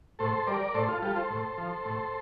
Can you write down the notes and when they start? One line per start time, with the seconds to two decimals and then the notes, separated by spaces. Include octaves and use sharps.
0.19 A2 A4 C5
0.47 G3 A#4 D5
0.74 A2 A4 C5
0.88 F4 A4
1.02 G3 F4 A4
1.16 A4 C5
1.30 A2
1.58 F3
1.85 A2